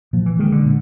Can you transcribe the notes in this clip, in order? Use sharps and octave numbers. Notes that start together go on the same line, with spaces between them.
A#2 F3
E3
D#3 G#3
D3
A#2